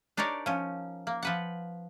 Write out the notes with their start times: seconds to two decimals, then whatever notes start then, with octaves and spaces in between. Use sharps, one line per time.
0.17 D4 D#4 G4 A#4 C#5 D5
0.46 F3 C#4
1.07 A#3
1.23 F3 B4 F#5